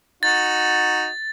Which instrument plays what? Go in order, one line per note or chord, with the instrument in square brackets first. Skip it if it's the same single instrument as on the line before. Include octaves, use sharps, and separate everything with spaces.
[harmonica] D#4 F#4 [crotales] A6